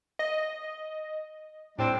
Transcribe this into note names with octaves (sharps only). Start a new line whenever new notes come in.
D#5
A2 G3 C4 D4